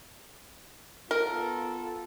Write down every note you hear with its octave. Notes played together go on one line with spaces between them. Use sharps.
B3 F4 A4 A#4